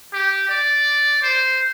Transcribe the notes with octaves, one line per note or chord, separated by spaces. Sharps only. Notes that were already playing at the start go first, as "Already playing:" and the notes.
G4
D5
C5